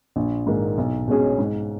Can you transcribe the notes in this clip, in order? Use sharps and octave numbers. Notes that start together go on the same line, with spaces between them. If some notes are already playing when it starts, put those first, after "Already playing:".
A#1
G#2 D#3 A#3
B1
B2 G#3 C#4 G#4
G#2